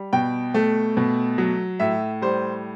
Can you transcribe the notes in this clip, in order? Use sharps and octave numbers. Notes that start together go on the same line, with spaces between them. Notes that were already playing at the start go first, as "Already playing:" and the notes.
Already playing: G3
B2 G5
A3
B2
F#3
A2 E5
G3 C5